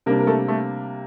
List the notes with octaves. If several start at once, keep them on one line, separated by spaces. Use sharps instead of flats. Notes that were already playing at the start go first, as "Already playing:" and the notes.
C3 G3 A#3 D4 A#4
A#4
A3 A4
A3 A4